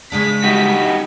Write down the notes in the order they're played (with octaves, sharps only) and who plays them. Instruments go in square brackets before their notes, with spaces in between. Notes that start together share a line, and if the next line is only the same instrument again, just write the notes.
[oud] C#3 G#3 D4 [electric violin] B6
[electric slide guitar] G3 D#4 F#4